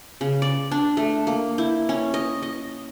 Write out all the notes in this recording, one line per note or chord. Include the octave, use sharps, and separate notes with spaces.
C#3
D5
D4
A3
A#3
E4
C#4
D#5
D#5